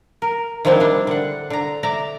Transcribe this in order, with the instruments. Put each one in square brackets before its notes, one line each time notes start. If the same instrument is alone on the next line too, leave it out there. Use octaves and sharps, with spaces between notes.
[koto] A#4
D#3 F3 G3 C4 D4 E4
G3 D4
D3 F#5
D3 A#5
D5 E5 A#5